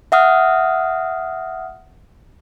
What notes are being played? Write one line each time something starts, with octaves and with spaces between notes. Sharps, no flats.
E5 F#5 D#6 F6